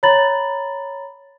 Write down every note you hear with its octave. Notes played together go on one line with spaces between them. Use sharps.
C#5 A#5 B5 A6 F#7